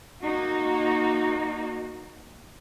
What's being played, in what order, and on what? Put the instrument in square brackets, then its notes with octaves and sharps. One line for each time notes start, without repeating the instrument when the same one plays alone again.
[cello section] A#3 D#4 F#4